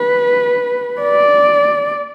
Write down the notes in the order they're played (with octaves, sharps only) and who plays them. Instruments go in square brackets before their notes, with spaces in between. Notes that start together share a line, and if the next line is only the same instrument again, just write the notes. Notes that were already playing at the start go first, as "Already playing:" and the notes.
Already playing: [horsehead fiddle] B4
D5